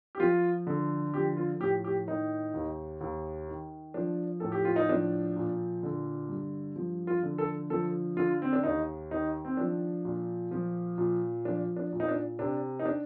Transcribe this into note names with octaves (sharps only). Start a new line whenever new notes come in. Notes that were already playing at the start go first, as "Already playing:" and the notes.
G4
F3 F4
D3
F3 G4
F4
A2 G4
G4
D#3 D#4
D#2
D#2
D#3
F3 D4
A2 A4
G4
F4
D#4
F3 D4
A#2
D3
G2
F3
F4
D3
A4
F3 A4
D3 F4
C4
D4
D#2 D#4
D#3 D#4
C4
F3 D4
A#2
F3
A#2
F3 D4
D4
A#2
D#4
D4
C3 D4
D#4
D4